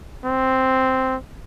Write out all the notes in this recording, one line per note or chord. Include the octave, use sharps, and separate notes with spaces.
C4